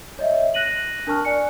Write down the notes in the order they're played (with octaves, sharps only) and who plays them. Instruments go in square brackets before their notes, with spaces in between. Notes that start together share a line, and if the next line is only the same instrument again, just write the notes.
[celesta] C#5 D#5 E5
F#6 A#6 D#7 F#7
D4 A#4 A5 C#6 F6
D5 G#5 F#6 C#7